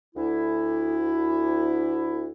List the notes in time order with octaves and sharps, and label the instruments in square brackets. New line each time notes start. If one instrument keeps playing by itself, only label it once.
[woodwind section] D2 E4